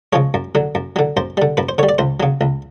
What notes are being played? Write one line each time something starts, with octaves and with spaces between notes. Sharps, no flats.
C#3 F3 G#3 C#5
F#2
D3 F#3
F#2
D3 F#3
F#2 C5
D3 G3
F#2 B4
C5
D3 G3 C#5
D5
C#2 C5
C#3 F#3
C#2